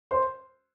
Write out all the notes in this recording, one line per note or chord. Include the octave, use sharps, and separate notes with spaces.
C5 C6